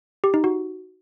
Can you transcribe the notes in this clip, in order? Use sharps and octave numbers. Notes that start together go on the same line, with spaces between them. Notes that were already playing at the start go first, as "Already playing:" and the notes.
G4
D#4
F#4